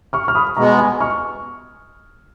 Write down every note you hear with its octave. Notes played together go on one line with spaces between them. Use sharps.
C#6 F6
F6
B5 D#6
B2 G#3 B3 A#5 C#6
G#5 B5
C#6 F6